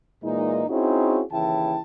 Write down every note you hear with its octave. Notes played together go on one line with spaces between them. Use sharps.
A#2 E3 G#3 A#3 D#4
C4 C#4 D#4 E4 F#4 G#4
D#2 C#3 E3 E4 G5 A5